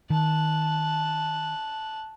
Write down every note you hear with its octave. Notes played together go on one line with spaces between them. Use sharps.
D#3 A5 F#6